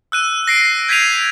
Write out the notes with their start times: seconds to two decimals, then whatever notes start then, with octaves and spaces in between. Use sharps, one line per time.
0.12 E6 F#6 D#7
0.48 A#6 C7 D7
0.88 G6 G#6 B6 C7 D#7 F7